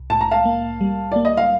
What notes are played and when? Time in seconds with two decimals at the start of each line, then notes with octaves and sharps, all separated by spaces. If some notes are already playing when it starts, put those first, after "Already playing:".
Already playing: C2
0.10 A2 A5
0.21 A#5
0.31 F5 A5
0.45 A#3
0.81 G3
1.12 A#3 D5
1.25 D#5
1.37 F5